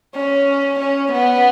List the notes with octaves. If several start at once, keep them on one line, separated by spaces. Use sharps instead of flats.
C#4
C#4
B3